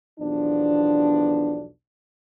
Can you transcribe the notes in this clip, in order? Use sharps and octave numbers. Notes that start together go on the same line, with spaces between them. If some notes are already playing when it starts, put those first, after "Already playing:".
B1 E2 F3 B3 D4